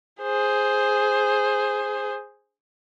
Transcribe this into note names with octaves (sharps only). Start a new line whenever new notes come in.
G#4 C5